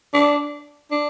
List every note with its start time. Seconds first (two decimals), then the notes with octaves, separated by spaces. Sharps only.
0.14 D4
0.91 D4